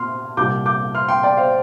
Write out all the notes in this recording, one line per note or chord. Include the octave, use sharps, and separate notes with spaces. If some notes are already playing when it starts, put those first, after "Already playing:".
Already playing: A#2 C6 F6
C2 A#2 G3 D6 G6
D6 G6
C6 F6
G5 C6
D5 G5
C5 F5